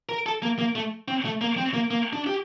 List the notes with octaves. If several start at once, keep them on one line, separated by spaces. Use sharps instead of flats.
A#4
A4
A#3
A#3
A3
C4
A3
A#3
C4
A#3
A#3
D4
G4